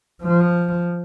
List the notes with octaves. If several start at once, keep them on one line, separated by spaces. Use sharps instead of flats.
F3